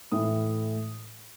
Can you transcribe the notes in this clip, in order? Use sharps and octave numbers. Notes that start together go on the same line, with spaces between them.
A2 E3 D#6